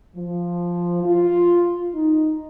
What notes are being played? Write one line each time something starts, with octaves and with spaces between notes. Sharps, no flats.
F3
F4
D#4